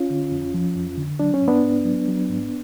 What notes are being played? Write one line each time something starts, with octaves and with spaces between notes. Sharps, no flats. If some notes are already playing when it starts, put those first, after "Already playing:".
Already playing: C#4 F4
D3
F2
F3
F2
D3
F#3 D4
C#4
G#2
B3 D4
G#2
F#3
F#3
G#2